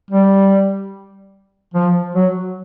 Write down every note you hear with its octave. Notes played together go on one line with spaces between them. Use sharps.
G3
F3
F#3